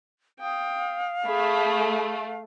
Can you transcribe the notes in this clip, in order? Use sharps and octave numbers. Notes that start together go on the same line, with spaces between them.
F5 G5 D#6
A3 G#4 B5